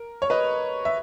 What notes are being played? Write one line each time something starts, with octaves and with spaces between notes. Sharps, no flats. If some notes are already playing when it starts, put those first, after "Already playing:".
Already playing: A#4
C#5
B4 D#5
E5